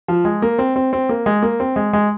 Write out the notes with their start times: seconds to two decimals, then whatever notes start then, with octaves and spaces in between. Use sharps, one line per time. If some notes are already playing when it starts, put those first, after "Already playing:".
0.08 F3
0.25 G#3
0.42 A#3
0.59 C4
0.76 C4
0.93 C4
1.09 A#3
1.26 G#3
1.42 A#3
1.60 C4
1.76 G#3
1.93 G#3